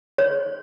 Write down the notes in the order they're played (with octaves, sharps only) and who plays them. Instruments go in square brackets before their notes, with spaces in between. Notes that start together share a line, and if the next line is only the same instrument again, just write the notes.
[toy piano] C#5